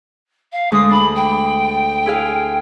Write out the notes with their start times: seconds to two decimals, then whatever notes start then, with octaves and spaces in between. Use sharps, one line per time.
0.52 F5
0.72 D2 G#3 C#6 D#6
0.90 D4 B5
1.15 G5
2.06 E4 G#4 F5